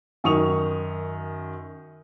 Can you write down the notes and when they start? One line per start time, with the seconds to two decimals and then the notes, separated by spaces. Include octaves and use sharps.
0.24 F#2 D#3 C#6 D#6 F7